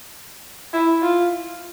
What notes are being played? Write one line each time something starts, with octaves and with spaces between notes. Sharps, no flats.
E4
F4